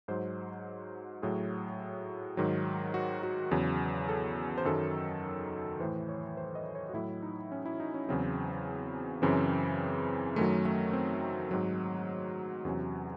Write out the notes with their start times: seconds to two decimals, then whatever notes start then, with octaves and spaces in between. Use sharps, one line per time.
0.08 G#2 F#3 C5
1.22 A2 F#3 G#4
2.37 G#2 D#3 F#3
2.94 F#4
3.23 F#4
3.51 E2 C#3 F#3
4.09 A4
4.58 C5
4.65 F#2 D#3 F#3 A4
5.80 A2 E3 C5
6.09 C#5
6.37 C5
6.55 D#5
6.75 C#5
6.89 F#4
6.94 A2 F#3 E4
7.22 D#4
7.52 C#4
7.66 E4
7.80 D#4
7.94 C#4
8.09 E2 C#3 F#3 C4
9.22 F#2 C#3 E3 C4
10.36 F#2 D#3 F#3 A3
10.65 A3
10.93 C4
11.51 G#2 F#3
12.65 E2 C3 F#3 C#4